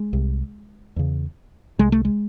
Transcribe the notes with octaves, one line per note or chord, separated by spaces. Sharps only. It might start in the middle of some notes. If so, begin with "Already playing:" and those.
Already playing: G#3
C2 C3
E2 C#3
C2 C3 G#3
A3
G#3